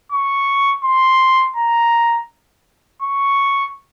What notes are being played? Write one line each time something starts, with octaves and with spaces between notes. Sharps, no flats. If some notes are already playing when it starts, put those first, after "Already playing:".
C#6
C6
A#5
C#6